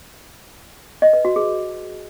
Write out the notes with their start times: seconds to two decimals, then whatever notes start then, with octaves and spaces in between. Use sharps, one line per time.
1.02 D#5
1.13 B4
1.25 F#4
1.36 G#4